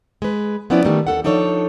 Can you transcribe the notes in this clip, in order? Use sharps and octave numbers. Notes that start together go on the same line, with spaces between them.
G#3 B4
F3 B3 C#4 E4 D5
D#3 G3 A3 B3 D#4
D#2 A4 F#5
F3 D4 D#4 A4 C#5